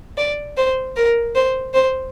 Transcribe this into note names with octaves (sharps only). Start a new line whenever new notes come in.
D5
C5
A#4
C5
C5